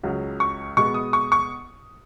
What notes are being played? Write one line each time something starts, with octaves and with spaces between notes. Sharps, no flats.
C#2 C#3 F#3
C#6
B2 G#3 B3 C#6
D#6
C#6
C#6